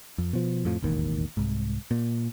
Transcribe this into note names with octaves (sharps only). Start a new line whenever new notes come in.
F2
B2 F3
F2 A2 F3
E1 A1 D#2 D#3
C2 G#2
A#2